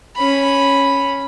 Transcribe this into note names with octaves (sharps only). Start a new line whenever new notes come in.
C#4 B5